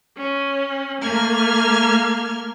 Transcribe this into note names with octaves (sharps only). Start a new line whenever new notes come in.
C#4
A3 A#3 F6 G#6